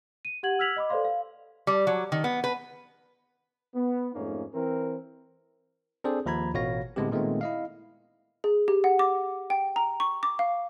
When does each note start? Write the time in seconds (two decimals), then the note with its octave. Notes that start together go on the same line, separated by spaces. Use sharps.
0.25 D#7
0.43 G4 F#5 G#6 F#7
0.59 E6 F6 G#6 B6 F7 F#7
0.76 D#5 B5 D6
0.89 A4 B4 C5 D5 F5 C6
1.05 F5
1.67 G3
1.87 F#3
2.12 D#3
2.24 B3
2.44 B4
3.75 B3
4.15 F2 G#2 A3 A#3 C#4 D#4
4.54 E3 C4 A#4
6.04 C4 D4 G#4 A4 C5 D5
6.26 D#2 F3 A#5 B5 G#6
6.54 A1 B2 F#4 C#5 F5 A#6
6.96 A2 D3 G#3 B3 C4 G4
7.11 A#2 D#3 G#3 A3 B3 C4
7.41 E4 D#5 F5
8.44 G#4
8.68 G4
8.84 F#5
8.99 D6
9.50 G5
9.76 A#5
10.00 C#6
10.23 D6
10.39 F5